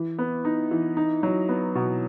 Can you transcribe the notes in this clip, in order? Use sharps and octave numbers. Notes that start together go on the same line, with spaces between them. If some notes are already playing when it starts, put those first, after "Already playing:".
Already playing: E3
B3
D#4
E3
D#4
F#3
B3
B2